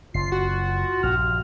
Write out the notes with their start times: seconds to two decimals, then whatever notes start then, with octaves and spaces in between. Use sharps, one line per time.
0.14 F#1 F4 C7
0.32 F#4
1.03 A#1 G2 F6